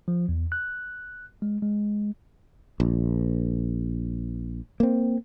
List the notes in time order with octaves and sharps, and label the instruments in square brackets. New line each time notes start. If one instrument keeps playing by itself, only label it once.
[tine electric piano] F3
E2
F#6
G#3
G#3
[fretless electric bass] A#1
A#3 C4